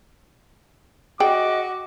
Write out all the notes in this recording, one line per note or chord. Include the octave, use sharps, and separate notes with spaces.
F#4 G#4 D5 D#5 G5 D6